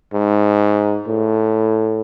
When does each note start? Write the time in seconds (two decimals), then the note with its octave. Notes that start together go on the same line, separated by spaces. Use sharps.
0.14 G#2
1.08 A2